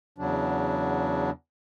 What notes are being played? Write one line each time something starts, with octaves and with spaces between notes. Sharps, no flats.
E2 C#3 F#3 D4